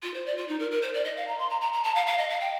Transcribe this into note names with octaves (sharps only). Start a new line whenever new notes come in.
F4
C5
D5
F4
D#4
A#4
A#4
C5
D5
D#5
F5
A#5
C6
A#5
A#5
A#5
A5
F5
F5
D#5
F5
G5